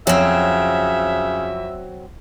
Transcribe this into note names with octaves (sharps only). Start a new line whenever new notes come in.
F2 C#3 F#3 C4 E5